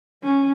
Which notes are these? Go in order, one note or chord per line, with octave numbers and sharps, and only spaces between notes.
C#4